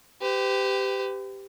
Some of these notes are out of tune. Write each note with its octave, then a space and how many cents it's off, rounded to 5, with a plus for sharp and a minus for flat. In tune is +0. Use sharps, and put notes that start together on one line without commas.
G4 +0 B4 +45